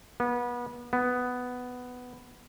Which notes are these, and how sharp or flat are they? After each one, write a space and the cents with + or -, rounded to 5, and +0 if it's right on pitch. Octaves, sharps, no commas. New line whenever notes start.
B3 -30
B3 +5